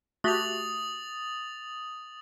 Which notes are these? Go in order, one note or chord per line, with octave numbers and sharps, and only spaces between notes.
A3 F#4 G4 D#6 A6 F7